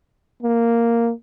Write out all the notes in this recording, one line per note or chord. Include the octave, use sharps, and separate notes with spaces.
A#3